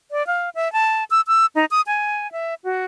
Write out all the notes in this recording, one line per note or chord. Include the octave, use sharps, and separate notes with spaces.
D5
F5
E5
A5
E6
E6
D#4
D#6
G#5
E5
F#4